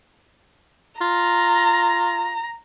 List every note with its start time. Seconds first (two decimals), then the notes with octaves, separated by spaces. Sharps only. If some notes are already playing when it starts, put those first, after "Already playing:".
1.01 F4 A#5